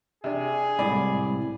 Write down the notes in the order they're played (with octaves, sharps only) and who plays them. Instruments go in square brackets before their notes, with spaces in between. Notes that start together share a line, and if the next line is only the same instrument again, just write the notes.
[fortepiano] C3 D4 [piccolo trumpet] G#4
[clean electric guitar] C2 [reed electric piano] A2 G#3 B5 [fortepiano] D5